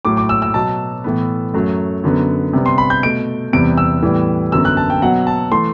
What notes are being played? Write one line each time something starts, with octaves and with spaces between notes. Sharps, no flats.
A2 F#3 A3 D6
D6
E6
E6
B2 F#3 B3 A5
A2 E3 B3
F#2 F#3 A3
F#2 D3 F#3 B3
C3 G3 B3
C6
B5
G6
B2 A3 D7
E2 C3 G3 B3 D7
E6
A2 E3 G3 B3
F#2 D3 F#3 B3 E6
F#6
A5
G5
B2 F#3 B3 F#5
A5
E3 A3 C6